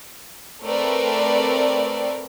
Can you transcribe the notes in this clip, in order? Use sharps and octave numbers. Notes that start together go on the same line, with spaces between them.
A3 C4 A#4 B4 D5